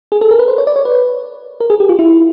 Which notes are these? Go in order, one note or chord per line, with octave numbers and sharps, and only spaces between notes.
G#4
A4
A#4
B4
C5
C#5
D5
C#5
B4
A#4
G#4
G4
F4
E4